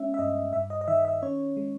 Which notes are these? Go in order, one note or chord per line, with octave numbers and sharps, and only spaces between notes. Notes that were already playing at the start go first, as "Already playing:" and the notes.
Already playing: G#3 B3 C#4 E5
E5
G2 D#5
G2 E5
D#5
D#5
D#3 E5
E5
C#4 C#5
G#3